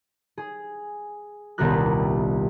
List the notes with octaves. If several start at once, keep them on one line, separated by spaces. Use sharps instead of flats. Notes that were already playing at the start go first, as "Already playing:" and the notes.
G#4
D#1 C2 B3 G4 A#4 F#6